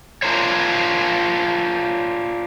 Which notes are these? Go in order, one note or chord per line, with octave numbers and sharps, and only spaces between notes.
D4 F4 A#4 C5 C#5